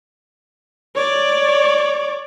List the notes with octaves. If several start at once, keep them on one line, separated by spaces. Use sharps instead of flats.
C#5 D5